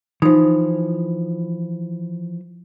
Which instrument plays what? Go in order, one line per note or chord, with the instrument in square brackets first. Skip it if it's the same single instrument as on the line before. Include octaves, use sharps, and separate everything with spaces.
[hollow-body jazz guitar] E3 F3 [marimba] D#4